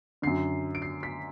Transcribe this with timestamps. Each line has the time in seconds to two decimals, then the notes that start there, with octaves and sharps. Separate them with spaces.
0.22 F#2 D3 C7
0.75 D7
0.82 C7
1.03 B6